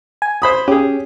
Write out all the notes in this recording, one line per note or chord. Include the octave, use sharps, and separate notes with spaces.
G#5
C5 B5 D#6
C#4 G4 G#4